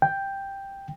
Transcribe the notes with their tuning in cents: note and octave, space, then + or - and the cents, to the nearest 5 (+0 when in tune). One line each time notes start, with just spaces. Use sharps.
G5 +5